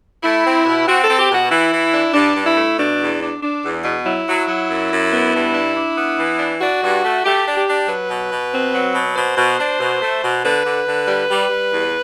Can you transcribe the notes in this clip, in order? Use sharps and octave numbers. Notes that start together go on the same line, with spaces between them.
A3 E4
C4
B2
C4 F#4
A4
C4
G4
B2 F#4
E3 E4
E3
D4
G2 D4
G2
E4
A3
B2 D4
E2
D4
D4
E2
B2
F#3 E4
F#3
F#3
F#2
F#2
B3
G2
D4
D4
B3
E3
D4
D4 F#4
G2
A3
A3 G4
D4
G4
D4
F#3 B4
B2
B2
C4
F#3
B2
B2 C5
B2
D4
B2
A3
B2
D3 B4
D3
D3
G3
G3
G3
E2